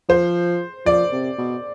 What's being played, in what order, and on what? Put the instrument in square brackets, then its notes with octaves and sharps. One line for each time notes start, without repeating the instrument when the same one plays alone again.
[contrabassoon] F3 [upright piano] C5
[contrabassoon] F3 [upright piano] D5
[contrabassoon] C3
B2